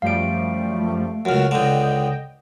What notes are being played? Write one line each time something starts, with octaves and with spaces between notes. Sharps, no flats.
F#2 F3 G3 A3 F5 D7
C#2 F#2 F#4 F6 E7
C#2 D3 D#5 G5